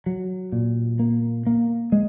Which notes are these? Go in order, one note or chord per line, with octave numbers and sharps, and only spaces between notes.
F#3
A#2
A#3
A#3
G#3